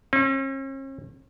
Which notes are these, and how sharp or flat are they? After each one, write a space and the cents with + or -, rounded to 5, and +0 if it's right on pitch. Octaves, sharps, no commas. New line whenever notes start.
C#4 -45